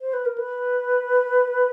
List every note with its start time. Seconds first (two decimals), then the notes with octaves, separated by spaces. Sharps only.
0.01 C5
0.13 B4
0.26 A#4
0.38 B4